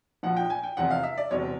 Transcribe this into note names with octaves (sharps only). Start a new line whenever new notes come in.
A#1 A#2 F3 F#5
G5
G#5
G5
F1 E2 C3 F#5
F5
E5
D5
E1 E2 C3 C#5